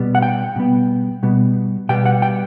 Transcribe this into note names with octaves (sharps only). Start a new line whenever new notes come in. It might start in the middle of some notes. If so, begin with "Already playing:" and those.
Already playing: B2 G3 B3
F#5
G5
B2 G3 B3
B2 G3 B3
B2 G3 B3 G5
F#5
G5